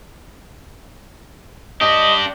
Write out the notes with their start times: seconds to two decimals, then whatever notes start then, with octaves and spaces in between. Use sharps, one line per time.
1.81 D4 G4 D#5